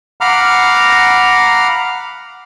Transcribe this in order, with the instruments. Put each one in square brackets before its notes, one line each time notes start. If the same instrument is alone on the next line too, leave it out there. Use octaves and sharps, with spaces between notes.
[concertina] F5 F#5 A#5 B5 D6 F6